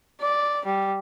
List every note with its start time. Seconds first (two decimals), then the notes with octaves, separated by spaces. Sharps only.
0.21 D5
0.65 G3